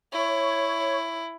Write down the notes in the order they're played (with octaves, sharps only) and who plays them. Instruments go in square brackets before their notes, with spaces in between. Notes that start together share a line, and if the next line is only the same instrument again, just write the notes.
[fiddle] E4 [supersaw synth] C#5